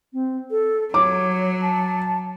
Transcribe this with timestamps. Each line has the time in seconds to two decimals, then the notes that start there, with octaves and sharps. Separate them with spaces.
0.13 C4
0.51 A4
0.94 F#3 C#5 D6
1.62 A5